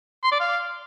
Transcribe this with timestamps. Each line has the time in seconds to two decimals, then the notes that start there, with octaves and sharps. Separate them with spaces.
0.23 C6
0.32 D5
0.40 F5